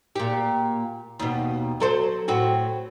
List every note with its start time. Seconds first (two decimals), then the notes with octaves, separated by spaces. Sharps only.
0.16 A#2 G4
1.19 D#2 B2
1.80 F#3 A4 C5
2.28 A2 C4 F#4